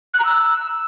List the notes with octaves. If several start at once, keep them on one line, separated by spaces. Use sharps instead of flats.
F#6
A#5
E6